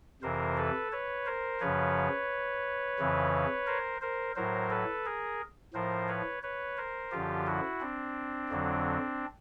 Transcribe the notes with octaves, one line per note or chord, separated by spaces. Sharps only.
F2 C3 E3 A#4 C5
A4 B4
B4 C#5
A#4 C5
F#2 C#3 F3 B4 C#5
F2 C#3 E3
A#4 C5
A#4 C5
A2 F#3 A#4 C5
A4 B4
G#4 A#4
A2 F3 A#4 C5
B4 C#5
B4 C#5
A#4 C5
F#2 D3 F3 F4 G4
E4 F#4
C4 D4
F2 D3 F#3